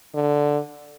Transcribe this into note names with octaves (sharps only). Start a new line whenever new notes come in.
D3